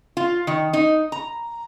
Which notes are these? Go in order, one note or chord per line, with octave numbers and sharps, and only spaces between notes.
F4
D#3
D#4
A#5